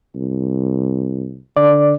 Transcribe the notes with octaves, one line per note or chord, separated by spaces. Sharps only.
C2
D3 D5